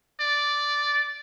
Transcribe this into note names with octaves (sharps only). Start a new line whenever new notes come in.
D5